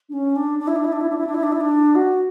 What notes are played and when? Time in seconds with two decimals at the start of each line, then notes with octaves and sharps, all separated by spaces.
0.09 D4
0.13 C#4
0.36 D4
0.59 D4
0.67 E4
0.76 D4
0.85 E4
0.92 D4
1.01 E4
1.09 D4
1.18 E4
1.27 D4
1.35 E4
1.43 D4
1.52 E4
1.60 D4
1.95 F#4